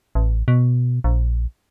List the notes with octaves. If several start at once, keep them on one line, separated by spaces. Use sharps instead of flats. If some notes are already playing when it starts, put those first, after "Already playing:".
A1
B2
A#1